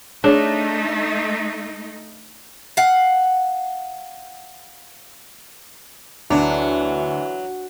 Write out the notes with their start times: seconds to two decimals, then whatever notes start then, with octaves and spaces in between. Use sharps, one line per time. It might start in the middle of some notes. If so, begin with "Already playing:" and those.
0.24 A3 D4 D#4 G#4 C#5
2.77 F5 F#5
6.30 D2 E3 F#3 D4